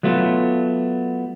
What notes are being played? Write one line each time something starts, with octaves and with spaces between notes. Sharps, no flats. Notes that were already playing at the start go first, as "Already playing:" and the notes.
F#3 A3 B3 F4